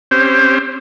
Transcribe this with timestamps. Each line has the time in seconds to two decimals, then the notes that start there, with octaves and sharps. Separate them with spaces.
0.11 C4 C#4 G4 C5